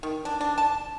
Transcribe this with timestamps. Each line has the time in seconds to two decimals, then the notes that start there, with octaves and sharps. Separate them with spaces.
0.03 D#3
0.25 D4
0.41 D4
0.58 A5